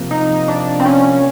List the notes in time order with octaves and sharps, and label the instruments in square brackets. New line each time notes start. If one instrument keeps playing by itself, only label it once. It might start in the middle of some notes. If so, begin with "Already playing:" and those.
Already playing: [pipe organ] C3 F3 A#3
[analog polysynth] D#4
D4
C4
C#4